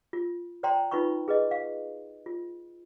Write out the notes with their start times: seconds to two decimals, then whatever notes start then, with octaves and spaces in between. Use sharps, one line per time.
0.13 F4
0.63 C5 D5 G5 A#5 C6
0.91 D#4 F4 B4 B5 C#6
1.28 G#4 B4 D#5
1.51 F5
2.26 F4